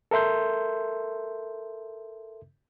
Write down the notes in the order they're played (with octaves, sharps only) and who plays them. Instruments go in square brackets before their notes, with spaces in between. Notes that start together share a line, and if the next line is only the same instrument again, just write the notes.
[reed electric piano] A4 A#4 E5 C6 G6